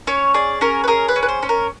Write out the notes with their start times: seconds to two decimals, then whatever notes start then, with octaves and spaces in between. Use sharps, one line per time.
0.07 C#4 C#5
0.34 G#4 D5
0.61 C#4 A#4
0.84 B4
0.88 G#4 A#4
1.08 B4
1.16 C#4
1.23 B4
1.29 C5
1.43 C#4
1.49 A#4